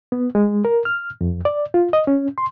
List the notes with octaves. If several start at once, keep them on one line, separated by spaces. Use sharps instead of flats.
B3
G#3
A#4
F6
F2
D5
F4
D#5
C#4
C6